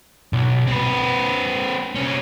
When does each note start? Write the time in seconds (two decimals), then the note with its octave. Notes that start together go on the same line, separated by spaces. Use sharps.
0.33 B1
0.67 C4 B4
1.95 C3 C#4